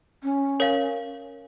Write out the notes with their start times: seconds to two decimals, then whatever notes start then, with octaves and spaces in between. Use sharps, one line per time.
0.23 C#4
0.60 A#4 C#5 F5